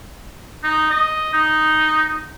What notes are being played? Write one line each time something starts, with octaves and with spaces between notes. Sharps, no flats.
D#4
D#5
D#4